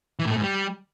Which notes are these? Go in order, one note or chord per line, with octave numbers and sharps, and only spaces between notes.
E3
A2
A3
G#2
G3